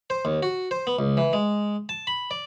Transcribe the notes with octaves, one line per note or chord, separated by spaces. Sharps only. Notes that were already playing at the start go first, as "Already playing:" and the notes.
C5
D#2
F#4
C5
B3
C#2
E3
G#3
A5
B5
D5